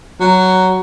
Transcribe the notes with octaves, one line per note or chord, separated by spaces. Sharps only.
F#3